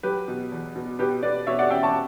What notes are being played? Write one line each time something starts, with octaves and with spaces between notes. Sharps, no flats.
F#3 G4 B4
B2
E2
B2
B2 G4 B4
B2 B4 D5
B2 C#5 E5
D5 F#5
C#4 E5 G5
A5 C#6